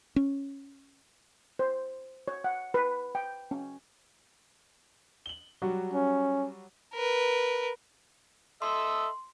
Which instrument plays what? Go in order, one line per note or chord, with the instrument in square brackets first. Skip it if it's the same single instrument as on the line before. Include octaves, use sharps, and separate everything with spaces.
[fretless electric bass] C#4
[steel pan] C5
C#5
F#5
B4
G5
C#4
[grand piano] F#7 G7
F#3 G3 F#4
[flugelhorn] C#4
[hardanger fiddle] A#4 B4
[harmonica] A4 D#5 E5 [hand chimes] C6